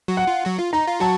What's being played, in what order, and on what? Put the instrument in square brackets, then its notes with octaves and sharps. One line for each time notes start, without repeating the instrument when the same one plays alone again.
[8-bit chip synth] F#3 F#4
[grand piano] F#5
[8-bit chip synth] F4
F#3 F#4
F4
[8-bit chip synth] D#4 [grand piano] A#5
[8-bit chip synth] F4
[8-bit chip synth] F#3 F#4 [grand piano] A5